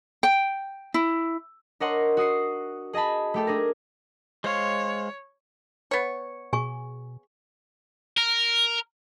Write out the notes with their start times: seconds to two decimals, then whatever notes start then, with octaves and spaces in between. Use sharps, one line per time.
0.23 G5
0.94 E4
1.80 D4 A#4 C#5 D#5 F#5 C6
2.17 F#4 D#6 C7 C#7
2.93 G#4 D#5 G#5 A5 B5
3.34 A3 G4 A4
3.47 D4 G#4 A#4
4.44 G#3 C5 C#5 F5
5.91 B3 C#5
6.53 B2 G#4 G#5 C#6
8.18 A#4